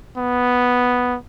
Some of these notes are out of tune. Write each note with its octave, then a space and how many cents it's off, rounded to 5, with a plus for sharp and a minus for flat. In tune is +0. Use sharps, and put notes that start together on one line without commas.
B3 +0